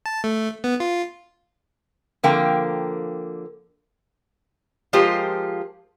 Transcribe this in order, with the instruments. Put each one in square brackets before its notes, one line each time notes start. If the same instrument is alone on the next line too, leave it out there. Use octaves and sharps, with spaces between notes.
[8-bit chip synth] A5
A3
B3
F4
[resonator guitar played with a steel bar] D3 F3 A#3 C4 A#4 G5
F3 G#3 F4 G4 A#4 C5